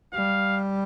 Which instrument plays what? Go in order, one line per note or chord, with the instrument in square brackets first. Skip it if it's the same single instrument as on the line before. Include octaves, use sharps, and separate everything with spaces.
[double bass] G3 [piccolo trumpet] F5